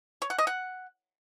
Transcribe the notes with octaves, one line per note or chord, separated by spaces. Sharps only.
C#5
F#5
D#5
F#5